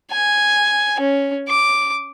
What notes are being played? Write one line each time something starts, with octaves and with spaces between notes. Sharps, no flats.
G#5
C#4
D6